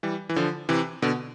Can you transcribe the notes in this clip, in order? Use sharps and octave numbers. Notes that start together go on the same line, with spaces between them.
E3 G3
E3
D3 F3
C3 E3
B2 D3